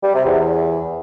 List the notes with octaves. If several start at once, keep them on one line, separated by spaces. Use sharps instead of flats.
G3
C3
E2